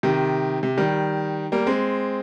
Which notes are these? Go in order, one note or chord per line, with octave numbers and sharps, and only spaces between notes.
C3 D#3
C3
D#3 G3
G3 A#3
G#3 C4